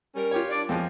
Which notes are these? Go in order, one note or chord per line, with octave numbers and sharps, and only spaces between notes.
G3 C#4 A#4
F4 G4 C#5
D4 D5
F2 F3 G#3 C#4